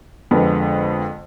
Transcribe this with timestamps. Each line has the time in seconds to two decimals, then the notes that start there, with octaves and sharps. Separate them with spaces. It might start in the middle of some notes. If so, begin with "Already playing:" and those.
0.31 F2 D3 G#3 B3